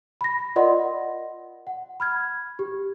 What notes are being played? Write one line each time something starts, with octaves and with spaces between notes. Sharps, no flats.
B5 A#6
F4 A#4 D5 D#5 F#5 C6
F#5
B5 F6 G#6
G4